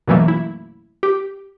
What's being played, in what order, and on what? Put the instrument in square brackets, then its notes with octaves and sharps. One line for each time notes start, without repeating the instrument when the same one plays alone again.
[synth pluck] F#2 B2 E3 F#3 A3 A#3
E4
G4